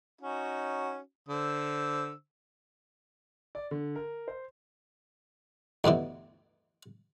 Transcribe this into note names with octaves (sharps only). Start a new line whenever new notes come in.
C#4 D#4 F#4
D3 C5 E6
D5
D3
A#4
C5
D2 G2 B2 E3